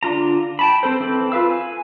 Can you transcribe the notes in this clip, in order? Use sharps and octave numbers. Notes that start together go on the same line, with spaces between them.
D3 D4 F4 A#5
G5 A5 B5
C4 A4 C5
E3 C4 A4 B5
F4 B4 F5 E6
G#5